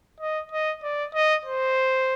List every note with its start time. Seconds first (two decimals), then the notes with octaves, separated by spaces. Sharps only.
0.20 D#5
0.52 D#5
0.83 D5
1.14 D#5
1.45 C5